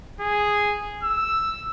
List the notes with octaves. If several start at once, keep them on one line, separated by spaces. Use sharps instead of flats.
G#4
E6